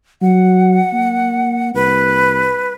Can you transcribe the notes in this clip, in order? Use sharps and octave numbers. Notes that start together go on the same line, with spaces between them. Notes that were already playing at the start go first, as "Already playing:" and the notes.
F#3 F#5
A#3
C2 B4